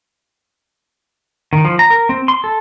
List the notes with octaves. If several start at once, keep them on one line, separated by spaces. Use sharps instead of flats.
D#3
F3
A#5
A#4
C4
C6
A4